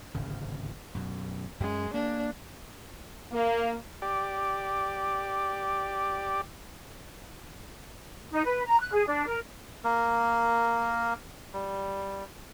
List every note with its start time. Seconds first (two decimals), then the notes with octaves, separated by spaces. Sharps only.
0.15 D1 G#1 C#3
0.95 F#2 B2
1.60 F#2 G#3 C#4
1.94 A#3 D4
3.32 A#3
4.02 G4 D5
8.31 D#4
8.44 B4
8.66 A#5
8.79 F#6
8.93 G#4
9.06 D4
9.26 A#4
9.84 A#3 A#4
11.53 G3